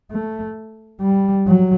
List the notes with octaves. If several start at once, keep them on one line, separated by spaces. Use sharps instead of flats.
A3
G3
F#3